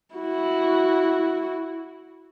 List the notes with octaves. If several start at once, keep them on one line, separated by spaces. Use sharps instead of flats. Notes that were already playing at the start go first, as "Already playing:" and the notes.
E4 F#4